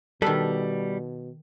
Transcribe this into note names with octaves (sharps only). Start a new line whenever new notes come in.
B2 D#3 G3 A4 B4